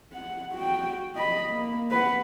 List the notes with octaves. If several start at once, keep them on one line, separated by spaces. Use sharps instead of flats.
F#5
F#4 G5
D#5 B5
A#3
B4 F#5